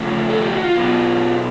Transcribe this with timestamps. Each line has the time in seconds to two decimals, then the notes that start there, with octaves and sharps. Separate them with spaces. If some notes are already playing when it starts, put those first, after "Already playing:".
Already playing: C#3 F3 A3
0.30 A4
0.41 G4
0.52 F#4
0.64 F4
0.75 B2 F#3 B3